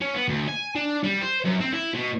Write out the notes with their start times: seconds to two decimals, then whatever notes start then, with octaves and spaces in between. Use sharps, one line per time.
0.01 C#4
0.14 B3
0.28 D2
0.48 G#5
0.75 D4
1.03 G3
1.21 C5
1.45 F#2
1.60 C4
1.73 E4
1.95 B2